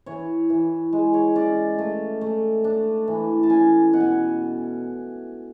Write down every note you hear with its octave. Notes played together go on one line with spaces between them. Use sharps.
E3 C#5
E3
G#3
C#5
C#4 D5
A3
A3
D4
E3
A5
C#4 G#5
B2 F#5
G#5